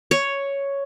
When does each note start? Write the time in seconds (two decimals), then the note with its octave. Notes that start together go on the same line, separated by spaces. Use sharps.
0.11 C#5